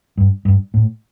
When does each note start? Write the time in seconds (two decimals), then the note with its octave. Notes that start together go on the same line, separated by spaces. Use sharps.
0.17 G2
0.45 G2
0.74 A2